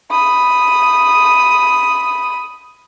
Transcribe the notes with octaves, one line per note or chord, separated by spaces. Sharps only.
B5 D#6